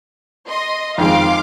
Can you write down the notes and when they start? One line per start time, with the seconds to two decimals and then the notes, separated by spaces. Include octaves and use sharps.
0.48 D#5 C6
0.98 F2 D#3 G#3 F5 C6 D6